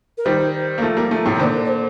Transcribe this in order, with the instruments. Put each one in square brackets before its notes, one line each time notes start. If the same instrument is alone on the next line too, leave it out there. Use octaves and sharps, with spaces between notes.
[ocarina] A#4
[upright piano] D#3 G3 [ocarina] C5
[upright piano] A#3
F3 A3
G3 A#3
F3 A3
A2 C3
D#3
[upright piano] A#2 D3 [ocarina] C5
[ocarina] A#4
D5
C5